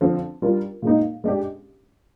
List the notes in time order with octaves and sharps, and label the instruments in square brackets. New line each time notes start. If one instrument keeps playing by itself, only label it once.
[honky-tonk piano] D3 F3 C4
G3 D4 F4 A#4
A#2 G#3 D#4
G#3 D4 G4